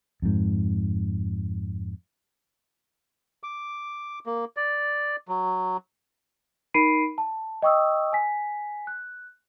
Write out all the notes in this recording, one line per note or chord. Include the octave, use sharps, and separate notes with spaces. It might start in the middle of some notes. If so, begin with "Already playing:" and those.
F2 G#2
D6
A#3
D5
F#3
D#4 A#4 B5 C7 D7 D#7
A5
D#5 G5 C#6 D#6 E6
G#5 B6
F#6